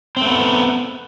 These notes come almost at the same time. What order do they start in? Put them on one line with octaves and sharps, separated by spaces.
C4 A3 B3